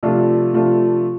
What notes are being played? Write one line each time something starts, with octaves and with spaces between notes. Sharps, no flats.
C3 F3 A3 D4 F4
C3 F3 A3 D4 F4